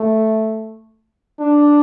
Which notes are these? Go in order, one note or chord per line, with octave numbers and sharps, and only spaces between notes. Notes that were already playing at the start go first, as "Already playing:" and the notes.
Already playing: A3
D4